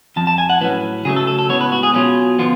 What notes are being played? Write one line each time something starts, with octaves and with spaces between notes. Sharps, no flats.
F2 F3 A5
A5
G#5
F#5
A2 F#3 C#4 B4
C#3 F#3 A3 G#4
A4
A4
A4
A2 G#3 B3 C#5
B4
F#4
G#4
B2 F#3 C#4 F4 G#4
D3 F3 B3 F4